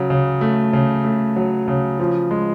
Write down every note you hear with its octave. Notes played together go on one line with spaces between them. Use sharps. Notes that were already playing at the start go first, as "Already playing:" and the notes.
Already playing: C#3 F#3
C#3
A3
C#3
A3
F#3
C#3
F3
G#3